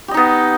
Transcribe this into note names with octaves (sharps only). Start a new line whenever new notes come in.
B3 D#4 G4 D#5